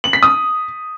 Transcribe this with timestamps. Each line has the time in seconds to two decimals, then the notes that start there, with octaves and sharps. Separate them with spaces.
0.04 F#7
0.13 B6
0.23 D#6